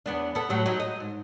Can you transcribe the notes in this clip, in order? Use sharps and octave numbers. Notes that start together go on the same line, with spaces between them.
E2 B3 D4
B3 A4
A2 F#3 G3
F#3 D#4
D#5
G#2